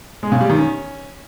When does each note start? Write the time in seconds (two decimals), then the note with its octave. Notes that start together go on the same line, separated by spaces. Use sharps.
0.23 G#3
0.32 C#3
0.41 G3
0.50 D#3
0.58 C#4